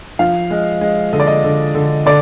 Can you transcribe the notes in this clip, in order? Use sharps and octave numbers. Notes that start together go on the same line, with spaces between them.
F3 F5
G#3
G#3
D3 D#5
D5
D#5
D3
D3
D3 D5